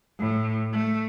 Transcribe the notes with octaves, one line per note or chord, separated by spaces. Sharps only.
A2
A3